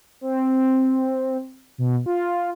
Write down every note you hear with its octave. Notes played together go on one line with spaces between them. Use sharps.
C4
B2
F4